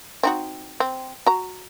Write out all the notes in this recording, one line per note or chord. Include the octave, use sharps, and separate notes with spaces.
C4 D#4 F#4
C4
F#4 A#5